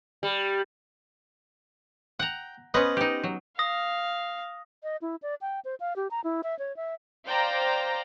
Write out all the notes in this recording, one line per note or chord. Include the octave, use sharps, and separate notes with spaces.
G3
F#5 G5 A#5
B3 C#4 B4 C5 D#5
D#4 G4
F#3
F5 D#6 A#6
D#5
E4
D5
G5
C5
F5
G4
A#5
E4
E5
C#5
E5
C5 D5 F5 G5 A#5